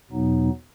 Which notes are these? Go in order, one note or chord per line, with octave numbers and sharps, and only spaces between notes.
E2 B2 F#3 B3 D#4